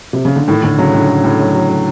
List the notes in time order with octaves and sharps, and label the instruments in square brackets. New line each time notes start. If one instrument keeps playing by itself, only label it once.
[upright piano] C3
C#3
D3
[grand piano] A2 [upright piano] D#3
[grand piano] A2 [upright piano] D3
[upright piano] C#3 [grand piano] F#3
[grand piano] A2 [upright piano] D3
[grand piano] A2
A2
F#3
F#3
F#3